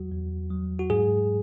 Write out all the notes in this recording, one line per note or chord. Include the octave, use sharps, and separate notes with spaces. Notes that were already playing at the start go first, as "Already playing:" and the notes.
Already playing: E2 F#3 F#4
E2
F#3
F#4
G#2 G#4